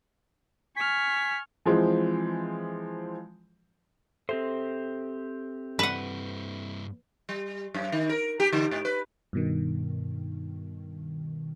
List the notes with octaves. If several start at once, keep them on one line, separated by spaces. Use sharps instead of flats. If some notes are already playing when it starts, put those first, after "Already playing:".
G#5 C#6 F6 B6
E3 F3 G#3 C4
C4 G4 A4 C5 E5
G2 E4 B4 F#5
G3
F#2
D#3
A#4
G4
D3
G#2
B4
G2 B2 D#3